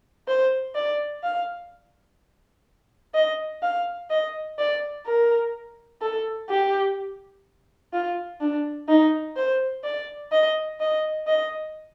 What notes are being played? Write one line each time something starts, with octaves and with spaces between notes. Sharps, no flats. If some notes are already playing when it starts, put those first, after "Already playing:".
C5
D5
F5
D#5
F5
D#5
D5
A#4
A4
G4
F4
D4
D#4
C5
D5
D#5
D#5
D#5